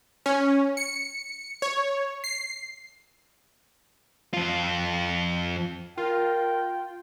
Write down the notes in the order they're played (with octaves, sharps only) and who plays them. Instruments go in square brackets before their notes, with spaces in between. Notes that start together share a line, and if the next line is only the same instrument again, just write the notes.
[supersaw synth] C#4
C#7
C#5
C7
[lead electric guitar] F2 F4
[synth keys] F4 [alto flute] A#4 [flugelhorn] G5